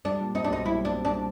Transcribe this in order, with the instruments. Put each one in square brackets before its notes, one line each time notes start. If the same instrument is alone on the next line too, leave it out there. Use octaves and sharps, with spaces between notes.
[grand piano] G3 [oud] D4
[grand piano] A#2
[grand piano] C4 [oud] D#4
[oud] D4
[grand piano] B1 [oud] D#4
[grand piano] G3 [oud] E4
[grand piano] A#2 [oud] D4
[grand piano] C4
[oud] D4